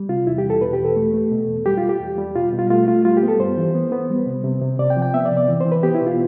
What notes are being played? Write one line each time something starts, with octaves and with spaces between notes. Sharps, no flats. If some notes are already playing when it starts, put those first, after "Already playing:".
Already playing: G3
C3 F4
E2 E4
G4
E2
A4
B2 B4
G4
E2
A4
A3
A3
B2
E2
G3 G4
F4
G3
G4
E2
G3
B2 F4
B2
F4
A3 F4
A3 F4
G3 F4
G4
B3
A4
G2 C5
E3
B3
B3
G3
C3
C3
C3
C3 D5
G5
F3
G5
B3 E5
D5
C3
D5
E3
C5
E3
B4
B3 G4
E4
B2
F4